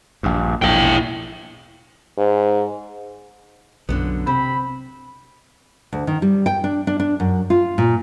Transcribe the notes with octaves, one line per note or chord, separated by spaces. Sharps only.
A#1 G2
A#1 E2 A2 E4 G5
G#2
B1 F#2 D3 F#3 B3
C3 C4 B5
D2
D#3
G3
G5
D4
D4
D4
F#2
F4
A#2